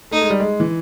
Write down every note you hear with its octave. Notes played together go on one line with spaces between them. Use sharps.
A3 D#4
G#3
G3
G#3
E3